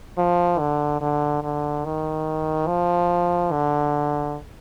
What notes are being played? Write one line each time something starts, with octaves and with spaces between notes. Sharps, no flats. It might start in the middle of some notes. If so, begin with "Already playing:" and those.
F3
D3
D3
D3
D#3
F3
D3